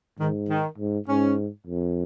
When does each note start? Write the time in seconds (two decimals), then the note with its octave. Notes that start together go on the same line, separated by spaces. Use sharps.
0.19 G#2 D#3
0.49 D#3
0.78 G#2
1.07 G#2 C#4
1.67 F2